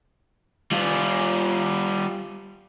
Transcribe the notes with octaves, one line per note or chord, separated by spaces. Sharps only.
G3 F4